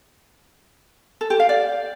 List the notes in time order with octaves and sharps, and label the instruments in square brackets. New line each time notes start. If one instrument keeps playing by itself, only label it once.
[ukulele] A4
G4
F5
D5